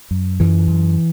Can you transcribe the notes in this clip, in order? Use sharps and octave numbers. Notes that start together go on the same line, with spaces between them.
F#2
F#2 E3
F#2